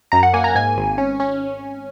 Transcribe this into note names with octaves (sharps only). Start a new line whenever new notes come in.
F#2 A#5
F#5
A#3 G#5
A#5
G#2 G#5
G#1
C#4
C#4